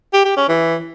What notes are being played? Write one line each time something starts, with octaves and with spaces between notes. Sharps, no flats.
G4
G4
C#4
E3